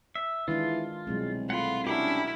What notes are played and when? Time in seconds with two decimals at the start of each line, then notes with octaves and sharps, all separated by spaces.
0.15 E5
0.48 D#3 E3 G#3 D4 F4
1.07 C2 B2 F#3 G#3
1.50 A3 F4 F#5 B5
1.87 C#4 D4 E4 F#4 G4 A#4